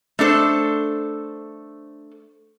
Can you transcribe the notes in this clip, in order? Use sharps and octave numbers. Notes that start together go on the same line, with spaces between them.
A3 D4 A4 C5